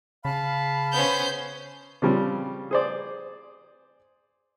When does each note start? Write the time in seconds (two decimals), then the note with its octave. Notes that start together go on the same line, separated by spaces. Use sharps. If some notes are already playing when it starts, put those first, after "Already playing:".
0.25 C#3 F5 A5 B5
0.92 B3 C#4 C5 G6
2.02 C#3 F3 G3 C4
2.71 G#4 C5 D5